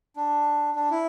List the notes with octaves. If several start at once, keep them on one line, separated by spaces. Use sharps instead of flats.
D4
D4
E4